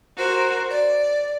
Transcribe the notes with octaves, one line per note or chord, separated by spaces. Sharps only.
F#4 A#4 C5
D5